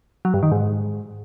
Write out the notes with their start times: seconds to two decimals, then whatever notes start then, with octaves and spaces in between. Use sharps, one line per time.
0.25 F#3
0.34 G2
0.43 D#3
0.52 G#2